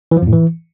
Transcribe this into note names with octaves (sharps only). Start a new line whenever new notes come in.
E3
F3
F2
A2
E3